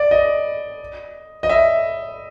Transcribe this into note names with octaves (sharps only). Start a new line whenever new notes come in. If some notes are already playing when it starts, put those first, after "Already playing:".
Already playing: D5
D#5
D#5
E5